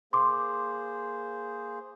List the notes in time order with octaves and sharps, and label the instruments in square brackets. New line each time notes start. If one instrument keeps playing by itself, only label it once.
[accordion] A#3 G#4 C5 [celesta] C6 D6